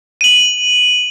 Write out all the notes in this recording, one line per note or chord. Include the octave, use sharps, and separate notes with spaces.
D#7 F#7